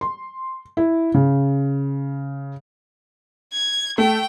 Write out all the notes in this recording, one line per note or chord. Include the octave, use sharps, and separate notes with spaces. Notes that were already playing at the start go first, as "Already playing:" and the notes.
C6
E4
C#3
G#6
A3 G5